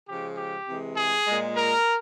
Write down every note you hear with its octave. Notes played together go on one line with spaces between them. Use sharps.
C#3 F3 G#3 G4
G4
C3 E3 G#3
G#4
A#2 G#3
A#4